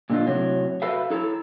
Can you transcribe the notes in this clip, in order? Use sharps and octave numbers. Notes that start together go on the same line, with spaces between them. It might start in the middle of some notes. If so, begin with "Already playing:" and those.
A#2 D3 A3 D#4 F4
A2 C3 F#3
F#4 A4 B4 E5 F5
E4 A4 A#5